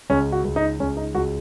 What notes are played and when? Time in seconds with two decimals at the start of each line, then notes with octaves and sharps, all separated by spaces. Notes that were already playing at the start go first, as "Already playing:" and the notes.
0.10 C#2 C#4
0.32 F#4
0.44 C#2
0.56 D#4
0.79 C#2 C#4
0.97 D#4
1.14 C#2 F#4